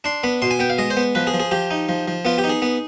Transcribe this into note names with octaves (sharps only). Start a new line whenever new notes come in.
D4 C6
B3 B5
B2 C6
G#5
B3 G5
F5
G#3 D#5
C5
B3
F3 B4
G#4
F3
G#4
F3 G4
D#4
F3
F3
B3 F4
G4
D#4
G#4
B3